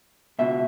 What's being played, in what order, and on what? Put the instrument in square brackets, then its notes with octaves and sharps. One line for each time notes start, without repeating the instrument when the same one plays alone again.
[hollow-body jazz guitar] C#2 B2 E5